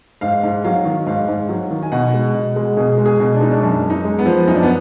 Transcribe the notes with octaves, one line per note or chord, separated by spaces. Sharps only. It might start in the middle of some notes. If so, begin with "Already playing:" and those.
G#2 F5
G#2
F#3 F5
D#3
G#2 F5
G#2
F#3
D#3
G#5
B2 F#5
G#3
B2
G#3
B2 G#4
G#3
G#4
B2
D4
G#3 D#4
D4
F#2 D4
F#2
D#4
G#3
B3
F3
F#2 D#4
D4
B3